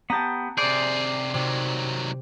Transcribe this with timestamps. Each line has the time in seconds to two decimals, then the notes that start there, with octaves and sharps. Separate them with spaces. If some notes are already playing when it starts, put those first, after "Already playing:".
0.10 B3 G4 A5 A#5
0.58 C3 G#4 C5 D5
1.34 C3 D#3 F#3